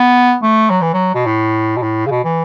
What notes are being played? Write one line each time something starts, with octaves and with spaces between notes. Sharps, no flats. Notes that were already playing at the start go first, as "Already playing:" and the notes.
Already playing: B3
A3
F#3
E3
F#3
B2
A2
B2
A2
C#3
B2
E3